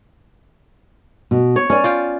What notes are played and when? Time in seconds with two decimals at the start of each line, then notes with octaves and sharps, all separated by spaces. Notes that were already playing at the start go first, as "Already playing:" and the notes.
1.31 B2
1.56 C#5
1.70 C#4 C#5 D5 G#5
1.84 F4 G5